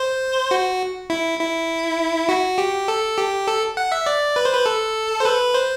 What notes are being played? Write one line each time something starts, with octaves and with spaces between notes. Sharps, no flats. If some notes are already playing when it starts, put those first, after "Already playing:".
Already playing: C5
F#4
E4
E4
F#4
G4
A4
G4
A4
F#5
E5
D5
B4
C5
B4
A4
C5
B4
C5